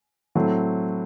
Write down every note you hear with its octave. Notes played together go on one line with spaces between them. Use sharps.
A2 F#3 A3 C4